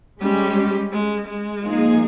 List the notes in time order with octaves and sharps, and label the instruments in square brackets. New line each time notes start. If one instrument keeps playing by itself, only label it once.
[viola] G3 [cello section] G#3 C#4 G4
[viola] G#3
G#3
[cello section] F3 A#3 D#4 G#4